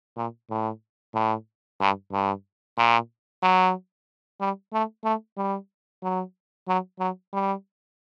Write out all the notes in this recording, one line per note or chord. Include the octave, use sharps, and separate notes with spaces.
A#2
A2
A2
G2
G2
A#2
F#3
G3
A3
A3
G3
F#3
F#3
F#3
G3